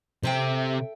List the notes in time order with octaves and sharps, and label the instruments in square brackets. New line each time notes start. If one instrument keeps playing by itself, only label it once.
[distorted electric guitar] C3 C4 [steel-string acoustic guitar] A4 E5 G5